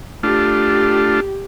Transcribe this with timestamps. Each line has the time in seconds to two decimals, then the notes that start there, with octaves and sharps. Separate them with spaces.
0.23 A3 D4 F4 G4